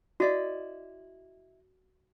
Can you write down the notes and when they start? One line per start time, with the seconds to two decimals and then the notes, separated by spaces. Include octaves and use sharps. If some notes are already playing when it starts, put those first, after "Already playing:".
0.20 E4 F#4 D5 D#5